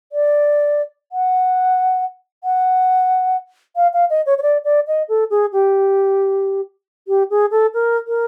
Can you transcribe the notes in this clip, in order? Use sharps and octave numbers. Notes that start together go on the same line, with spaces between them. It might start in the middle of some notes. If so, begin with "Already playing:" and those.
D5
F#5
F#5
F5
F5
D#5
C#5
C#5
D5
D5
D#5
A4
G#4
G4
G4
G#4
A4
A#4
A#4